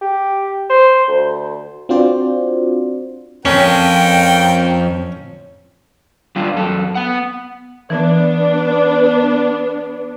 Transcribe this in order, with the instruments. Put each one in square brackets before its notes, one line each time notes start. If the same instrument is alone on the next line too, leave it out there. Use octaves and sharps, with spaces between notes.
[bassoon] G4
C5
D2
[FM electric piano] C4 D4 F4 F#4 C5 D5
[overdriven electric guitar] F2 [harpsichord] C#4 [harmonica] A#4 G5
[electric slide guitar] G3 D4 F4
F#2 A4
B3 F#5
[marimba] E3 [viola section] B3 D4